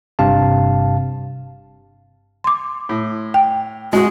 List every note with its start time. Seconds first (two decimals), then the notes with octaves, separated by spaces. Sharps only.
0.19 G1 G2 C3 F5 A5
2.44 C6 D6
2.89 A2
3.34 G5
3.93 G#3 F#4 G#4